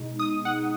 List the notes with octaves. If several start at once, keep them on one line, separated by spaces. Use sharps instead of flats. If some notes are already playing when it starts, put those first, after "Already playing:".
Already playing: B2 G#3 D#4
D#6
F#5